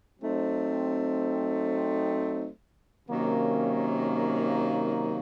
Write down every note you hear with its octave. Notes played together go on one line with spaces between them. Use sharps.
F#3 A3 C4 D#4
C3 D#3 F#3 A#3 C#4